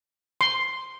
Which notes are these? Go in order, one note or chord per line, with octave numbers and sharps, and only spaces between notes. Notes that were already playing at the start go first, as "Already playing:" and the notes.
C6